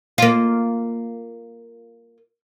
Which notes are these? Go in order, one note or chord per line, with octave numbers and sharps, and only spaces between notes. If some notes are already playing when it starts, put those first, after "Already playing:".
A#3 F4